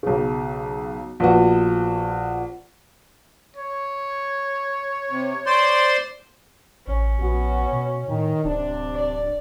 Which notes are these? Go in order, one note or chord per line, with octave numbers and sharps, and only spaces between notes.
B1 C#3
A#1 B3 F#4
C#5
C3
C5 D5 C6
A1 C#4
A#1 B3 F#4
B2
A2 D#3
D1 C3 D4
D5